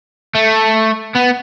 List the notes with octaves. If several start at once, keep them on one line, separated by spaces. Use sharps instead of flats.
A3
B3